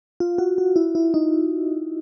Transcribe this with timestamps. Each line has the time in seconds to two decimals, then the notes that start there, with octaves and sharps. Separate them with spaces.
0.20 F4
0.38 F#4
0.58 F#4
0.76 E4
0.95 E4
1.14 D#4